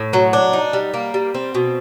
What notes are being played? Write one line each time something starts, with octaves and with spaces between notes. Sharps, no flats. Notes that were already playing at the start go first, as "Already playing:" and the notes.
Already playing: A2
F#3
D4
D#4
G3
A#3
G3
C4
B2